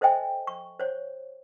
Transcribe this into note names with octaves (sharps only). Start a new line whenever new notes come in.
A4 C5 D#5 E5 G5 G#5
C#6
C5 C#5